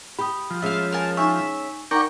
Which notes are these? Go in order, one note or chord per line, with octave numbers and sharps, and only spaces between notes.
G4 B5 D#6
F3
G#3 C#4 E5 F5
A#4 G#5 A5
D#4 E5 G#5 C#6
D#4 A#4 D5 F#5 G5 C#6